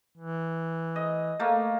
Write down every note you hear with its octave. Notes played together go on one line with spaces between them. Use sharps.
E3
D#5
A3 A#3